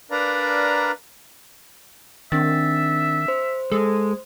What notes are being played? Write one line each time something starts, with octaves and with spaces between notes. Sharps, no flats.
D4 A#4 B4 D5 F5 A#5
D#3 C4 D4 E5 A6
C5
G#3 A4